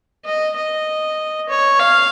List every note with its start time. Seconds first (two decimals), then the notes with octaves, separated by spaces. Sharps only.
0.25 D#5
0.57 D#5
1.49 C#5
1.80 F5